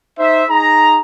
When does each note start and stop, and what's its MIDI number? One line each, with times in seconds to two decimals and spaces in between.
0.19 0.45 63
0.19 0.45 72
0.19 0.45 76
0.50 1.02 63
0.50 1.02 68
0.50 1.02 82